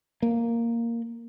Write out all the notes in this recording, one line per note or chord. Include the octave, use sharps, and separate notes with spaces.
A#3